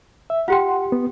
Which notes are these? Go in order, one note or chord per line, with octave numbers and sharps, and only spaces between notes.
E5
F4 G4 F#5 G5 C6
B3